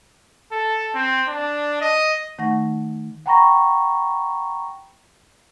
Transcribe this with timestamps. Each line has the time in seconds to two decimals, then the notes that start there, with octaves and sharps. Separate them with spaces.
0.52 A4
0.95 C4
1.28 D4
1.81 D#5
2.39 D#3 A3 D#4 F#5 C#6 A#6
3.26 F#5 G5 A#5 B5 C#6 A#6